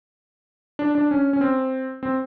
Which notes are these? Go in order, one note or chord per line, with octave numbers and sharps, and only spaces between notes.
D4
D4
C#4
C#4
C4
C4